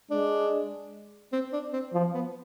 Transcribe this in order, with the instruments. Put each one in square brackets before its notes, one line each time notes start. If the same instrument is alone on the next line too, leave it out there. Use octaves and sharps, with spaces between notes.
[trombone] G#3 [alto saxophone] D4
[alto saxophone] C4
D4
C4
[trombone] F3
[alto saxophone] B3